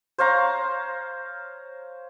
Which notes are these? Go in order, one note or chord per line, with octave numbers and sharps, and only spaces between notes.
C5 C#5 F5 A#5